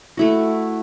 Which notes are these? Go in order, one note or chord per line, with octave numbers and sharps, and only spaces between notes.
A3 E4 F#4